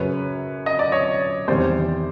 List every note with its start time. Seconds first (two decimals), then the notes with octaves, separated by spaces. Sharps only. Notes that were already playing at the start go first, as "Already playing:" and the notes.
Already playing: F#2 C#3 F#3 B4 C#5
0.66 D#5
0.79 D5
0.92 C#5 D#5
1.48 E2 C3 D#3 G3 C5 D5